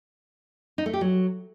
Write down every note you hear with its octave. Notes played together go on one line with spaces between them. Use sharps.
D#4
A3
G4
F#3